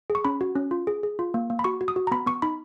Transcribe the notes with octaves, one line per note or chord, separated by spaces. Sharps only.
G#4
C#6
C#4 B5
F#4
C#4
F4
G#4
G#4
F4
A#3
A#3
B5
F#4 C#6
F#4
D#6
F#4
A#5
B3 B5
B3 C#6
D#4 B5